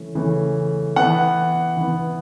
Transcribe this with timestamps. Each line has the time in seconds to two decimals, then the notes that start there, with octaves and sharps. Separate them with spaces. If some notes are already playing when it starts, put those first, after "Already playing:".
Already playing: C#3 E3 A3 C#4
0.15 C#3 E3 A3 C#4
0.96 E3 B3 F#5
1.77 E3 B3